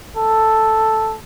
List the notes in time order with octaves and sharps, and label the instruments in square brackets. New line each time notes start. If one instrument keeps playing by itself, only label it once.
[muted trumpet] A4